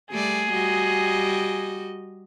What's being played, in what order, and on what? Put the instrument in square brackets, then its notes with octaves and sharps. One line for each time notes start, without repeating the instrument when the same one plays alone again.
[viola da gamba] G3 A3 D5 [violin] G#4
[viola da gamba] G3 F#4 D#5